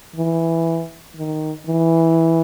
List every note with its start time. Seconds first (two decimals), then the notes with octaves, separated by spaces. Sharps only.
0.16 E3
1.17 D#3
1.67 E3